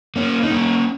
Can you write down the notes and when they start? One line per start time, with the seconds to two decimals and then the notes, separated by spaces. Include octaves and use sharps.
0.16 A#3 C#4
0.43 D#4
0.50 A#3 C#4